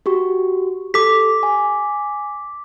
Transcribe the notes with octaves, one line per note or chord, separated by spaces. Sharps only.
F#4 G4 C#6
G4 A4 D6 B6
G#5